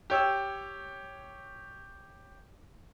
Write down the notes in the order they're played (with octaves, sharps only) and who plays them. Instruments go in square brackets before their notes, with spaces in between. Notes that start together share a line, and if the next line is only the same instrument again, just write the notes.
[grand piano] G4 C#5 E6